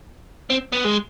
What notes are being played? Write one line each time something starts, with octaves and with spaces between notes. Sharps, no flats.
C4
B3
G#3